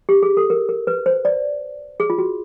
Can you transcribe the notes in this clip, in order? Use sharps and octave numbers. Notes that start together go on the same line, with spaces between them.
G4
G#4
A4
A#4
A#4
B4
C5
D5
G#4
F4
F#4